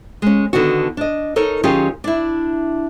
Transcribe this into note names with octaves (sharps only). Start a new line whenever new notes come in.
G#3 C#4
D3 D#3 B3 D4 F#4
D4 D#5
D#4 A4 A#4 C#5
D#3 F#3 C#4 F4 G4 G#4
D4 E4